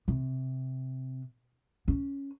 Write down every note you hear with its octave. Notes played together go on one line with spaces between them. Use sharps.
C3
C#4